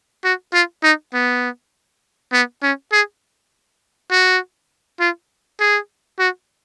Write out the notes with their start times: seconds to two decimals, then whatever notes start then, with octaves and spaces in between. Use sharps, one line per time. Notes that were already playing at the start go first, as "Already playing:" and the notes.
0.24 F#4
0.53 F4
0.83 D#4
1.13 B3
2.33 B3
2.63 C#4
2.92 G#4
4.11 F#4
5.00 F4
5.60 G#4
6.19 F#4